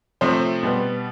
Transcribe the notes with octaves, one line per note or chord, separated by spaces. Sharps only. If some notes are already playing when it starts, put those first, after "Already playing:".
C3 F3 A3 C4 C5
B2 G3 B3